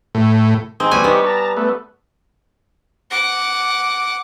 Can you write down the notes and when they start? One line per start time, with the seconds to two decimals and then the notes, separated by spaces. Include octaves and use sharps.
0.15 A2
0.80 C4 D#4 G#4
0.91 D2 G3 B3 G#5 C#6
1.04 B3 D#4 G4 C#6
1.26 A5 A#5
1.57 A3 B3
3.11 F#5 D6